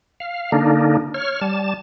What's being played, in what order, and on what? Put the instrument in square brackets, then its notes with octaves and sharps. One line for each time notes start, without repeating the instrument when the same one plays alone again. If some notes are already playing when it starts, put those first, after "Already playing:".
[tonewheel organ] F5
D3 A#3 D4 D#4
C#5 F6
G3 A5